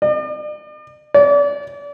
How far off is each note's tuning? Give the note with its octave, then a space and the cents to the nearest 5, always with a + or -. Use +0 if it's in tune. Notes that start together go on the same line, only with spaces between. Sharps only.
D5 +45
D5 -35